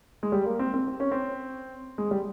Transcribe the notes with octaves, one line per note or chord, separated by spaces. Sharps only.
G#3
G3
A#3
C4
C4
C4
C#4
C4
G#3
G3